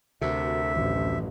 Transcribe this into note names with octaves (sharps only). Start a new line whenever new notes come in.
D2 C3 F#4 A4 A#4 E5
A1 F#2 D#3 E3